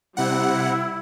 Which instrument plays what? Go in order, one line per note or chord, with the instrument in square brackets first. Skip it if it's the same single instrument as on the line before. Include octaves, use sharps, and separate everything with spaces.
[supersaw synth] C3 F#5 [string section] G3 [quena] E4